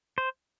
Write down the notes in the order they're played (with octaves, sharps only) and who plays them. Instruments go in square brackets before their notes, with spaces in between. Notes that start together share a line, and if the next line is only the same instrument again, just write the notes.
[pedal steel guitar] C5